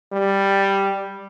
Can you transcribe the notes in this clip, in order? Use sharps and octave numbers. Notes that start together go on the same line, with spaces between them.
G3